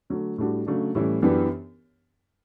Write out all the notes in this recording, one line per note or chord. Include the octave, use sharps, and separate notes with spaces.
D3 F#3 A3
A2 G3 D4 F#4
C#3 F#3 A3 D4
A2 E3 G3 C#4 E4
F#2 E3 B3 D4 G4